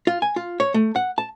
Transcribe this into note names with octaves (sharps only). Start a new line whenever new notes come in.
F4
G#5
F4
C#5
A3
F#5
A5